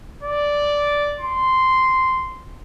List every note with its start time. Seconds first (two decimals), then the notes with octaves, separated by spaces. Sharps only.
0.23 D5
1.20 C6